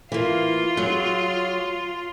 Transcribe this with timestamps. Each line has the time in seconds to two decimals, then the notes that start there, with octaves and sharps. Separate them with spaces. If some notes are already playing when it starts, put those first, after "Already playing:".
0.12 E3 A#3 F4
0.77 F#3 G#4